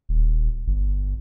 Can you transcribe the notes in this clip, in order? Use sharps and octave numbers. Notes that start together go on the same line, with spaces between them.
D#1
G1